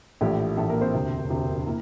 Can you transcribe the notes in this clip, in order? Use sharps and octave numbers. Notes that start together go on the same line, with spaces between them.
A#1 A2 E3 A3 G4
A#1 A2 E3 A3 A4
A#3 A#4
C4 C5
E1 D2 C3
E1 D2 C3
A#3 E4